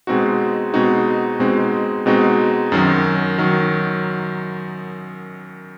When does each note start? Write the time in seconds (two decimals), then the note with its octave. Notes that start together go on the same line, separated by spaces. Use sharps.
0.07 B2 G#3 C4 D#4 F#4
0.74 B2 G#3 C4 D#4 F#4
1.39 B2 G#3 C4 D#4 F#4
2.06 B2 G#3 C4 D#4 F#4
2.72 F#2 D#3 F#3
3.38 D#3 F#3